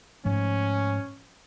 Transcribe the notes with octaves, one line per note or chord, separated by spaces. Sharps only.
G#2 F3 A3 C#4